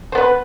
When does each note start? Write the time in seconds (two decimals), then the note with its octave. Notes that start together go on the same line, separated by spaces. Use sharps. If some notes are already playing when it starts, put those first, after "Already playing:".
0.12 C5
0.15 B3
0.18 B4